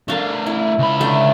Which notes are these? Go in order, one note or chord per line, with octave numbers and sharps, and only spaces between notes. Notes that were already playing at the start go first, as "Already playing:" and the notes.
A3 D4 A#4 F5
E4
C#2 B5
D3 A3 G5